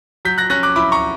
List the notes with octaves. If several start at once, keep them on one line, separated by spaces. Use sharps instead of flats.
F#3 G6 B6
F#6 A#6
C#4 F#6 A#6
D6 F#6
E4 B5 D6
A#5 C#6